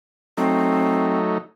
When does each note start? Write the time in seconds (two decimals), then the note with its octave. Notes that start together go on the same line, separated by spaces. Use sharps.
0.37 F#3 A3 C4 D#4